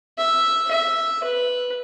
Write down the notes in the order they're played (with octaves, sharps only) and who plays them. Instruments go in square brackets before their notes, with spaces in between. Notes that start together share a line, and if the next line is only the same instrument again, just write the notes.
[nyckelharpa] E5
E5
B4